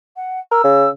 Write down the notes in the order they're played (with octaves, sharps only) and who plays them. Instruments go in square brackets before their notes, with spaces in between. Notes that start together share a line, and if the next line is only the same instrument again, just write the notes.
[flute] F#5
[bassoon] A#4 [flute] E6
[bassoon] C#3